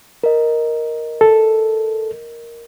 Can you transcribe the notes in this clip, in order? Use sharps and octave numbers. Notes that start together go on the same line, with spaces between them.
A#4 D#5
A4